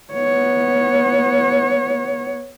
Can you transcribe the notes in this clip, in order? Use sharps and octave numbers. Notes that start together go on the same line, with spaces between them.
B3 C#5